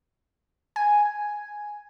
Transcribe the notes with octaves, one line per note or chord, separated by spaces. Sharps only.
G#5